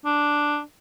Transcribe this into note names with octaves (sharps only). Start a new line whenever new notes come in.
D4